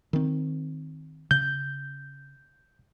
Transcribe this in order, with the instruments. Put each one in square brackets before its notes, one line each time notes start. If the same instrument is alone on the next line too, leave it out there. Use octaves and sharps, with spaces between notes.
[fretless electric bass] D#3 C4
[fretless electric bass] C#3 [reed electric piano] G6